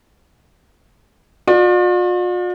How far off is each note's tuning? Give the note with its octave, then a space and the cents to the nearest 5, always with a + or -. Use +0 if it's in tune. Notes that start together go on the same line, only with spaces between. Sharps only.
F4 +45 D5 +35